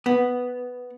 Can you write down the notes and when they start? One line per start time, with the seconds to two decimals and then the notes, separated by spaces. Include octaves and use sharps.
0.06 B3